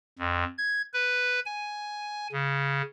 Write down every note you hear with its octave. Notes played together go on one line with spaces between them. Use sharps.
F2
G#6
B4
G#5
C#3